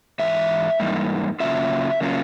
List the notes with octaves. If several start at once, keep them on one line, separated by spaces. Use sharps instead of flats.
G#2 E3 E5
G#2 E3 G3 A#3 D#4
C#3 F#3 A#3 C#4 F4 E5
C#3 F#3 A#3 C#4 F4